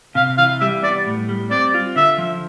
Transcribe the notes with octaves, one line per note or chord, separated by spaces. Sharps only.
C3 F5
E3 F5
G3 E5
B3 D5
A2
G3
C4 D5
F4
D3 E5
F3